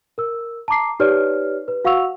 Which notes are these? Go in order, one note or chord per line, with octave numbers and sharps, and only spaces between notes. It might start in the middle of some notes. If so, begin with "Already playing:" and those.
A#4 E6
A5 A#5 D6 C7
D#4 G4 B4 C#5 D5 F6
B4
F#4 F5 F#5 C#6 E6 F7